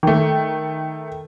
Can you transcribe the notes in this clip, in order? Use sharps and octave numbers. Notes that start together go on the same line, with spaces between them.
D#3 A3